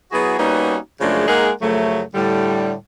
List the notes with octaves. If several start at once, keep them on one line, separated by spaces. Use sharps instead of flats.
F#3 B3 E4 F#4 G#4
G3 A#3 B3 C#4 D#4 F#4
F#2 C#3 F3 G#3 A3 D4
G#3 A#3 D#4 G#4 A#4 F#5
F#2 C#3 F3 F#3 A3
A2 D3 G3